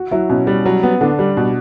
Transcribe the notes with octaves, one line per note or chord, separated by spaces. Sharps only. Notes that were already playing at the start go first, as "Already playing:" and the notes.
Already playing: F#4
F#3 E4
B2 C#4
G3
F#3
B3
D3 D4
G3
B2